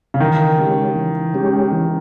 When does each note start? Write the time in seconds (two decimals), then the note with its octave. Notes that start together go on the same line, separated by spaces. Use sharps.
0.14 C#3
0.20 D#3 E3
0.58 G#3 C#4 G4
0.96 E3
1.34 G#3 C#4 G4
1.72 E3